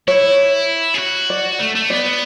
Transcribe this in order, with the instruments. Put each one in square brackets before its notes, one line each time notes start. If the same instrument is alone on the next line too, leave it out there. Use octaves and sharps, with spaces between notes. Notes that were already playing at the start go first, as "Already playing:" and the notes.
[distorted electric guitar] E4 [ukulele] C#5
[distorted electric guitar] G#4
F#4
[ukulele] D5
[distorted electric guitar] A3
A3
[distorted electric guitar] B3 [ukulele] D5